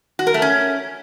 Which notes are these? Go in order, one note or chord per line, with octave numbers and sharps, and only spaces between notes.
F#4
A#4
A3
C#4